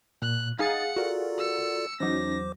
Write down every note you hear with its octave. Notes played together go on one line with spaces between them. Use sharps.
A#2 F#6
D#4 G#4 F5 F#5 D#6 A6 C#7
F4 F#4 A4 A#4 D5
E6 C#7
E2 F#3 C#4 D#4 C5 D6 A#6